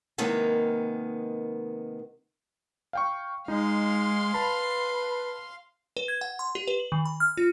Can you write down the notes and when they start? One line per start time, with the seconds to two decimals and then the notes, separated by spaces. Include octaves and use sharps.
0.18 C3 D#3 G#3 A#3 B3
2.93 F5 G5 C#6
3.48 G#3 D#4 F5 C6
4.34 B4 A5 B5
5.97 B4
6.08 G#6
6.21 F#5
6.39 C6
6.55 G4
6.68 B4
6.80 F#7
6.92 D#3
7.06 B5
7.20 F6
7.37 F4